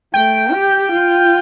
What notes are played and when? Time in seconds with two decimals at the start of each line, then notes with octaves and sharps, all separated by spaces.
0.14 A3 G5
0.52 G4
0.92 F4